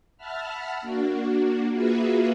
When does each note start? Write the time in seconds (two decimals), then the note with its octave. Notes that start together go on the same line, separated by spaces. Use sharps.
0.17 E5 F#5 A5 B5 F6
0.82 A#3 D4 F#4
1.72 A#3 F4 F#4 G#4 B4 E5